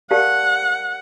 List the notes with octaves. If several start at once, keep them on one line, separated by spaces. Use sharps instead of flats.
G4 A#4 D5 F5 F#5 A5